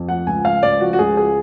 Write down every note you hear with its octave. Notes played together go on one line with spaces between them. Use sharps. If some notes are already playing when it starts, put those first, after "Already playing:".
Already playing: F2
F3 F#5
C#2 G#5
C#2 F5
C#2 D5
F3 F#4
F#4
C#2 G#4
G#4